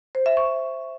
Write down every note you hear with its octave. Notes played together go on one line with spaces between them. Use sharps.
C5
E5
C#6